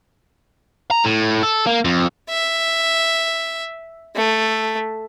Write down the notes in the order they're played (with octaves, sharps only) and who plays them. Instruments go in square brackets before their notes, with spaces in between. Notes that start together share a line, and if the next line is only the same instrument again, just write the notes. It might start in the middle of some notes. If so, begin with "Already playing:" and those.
[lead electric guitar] A#5
A2
A4
A#3
F2
[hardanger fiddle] E5
A3